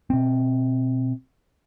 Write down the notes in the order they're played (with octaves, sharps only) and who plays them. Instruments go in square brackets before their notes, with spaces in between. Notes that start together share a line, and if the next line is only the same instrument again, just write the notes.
[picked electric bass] B2 C4